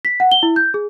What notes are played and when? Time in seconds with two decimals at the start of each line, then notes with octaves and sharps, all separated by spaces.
0.05 B6
0.20 F#5
0.32 G7
0.43 E4
0.56 G6
0.74 G#4